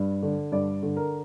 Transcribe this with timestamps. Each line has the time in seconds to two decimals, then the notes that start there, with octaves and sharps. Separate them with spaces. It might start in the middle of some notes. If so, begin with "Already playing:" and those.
Already playing: G2
0.23 D3
0.52 G2 D5
0.83 D3
0.97 A#4